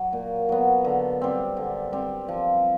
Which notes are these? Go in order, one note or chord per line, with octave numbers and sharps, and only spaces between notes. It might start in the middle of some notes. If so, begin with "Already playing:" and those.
Already playing: F#3
A#2
F#3 B3
D3
G3 C4
D3
G3 C4
F3